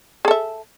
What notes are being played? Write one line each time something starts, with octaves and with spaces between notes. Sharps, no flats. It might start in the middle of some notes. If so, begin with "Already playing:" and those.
G#4 A4 E5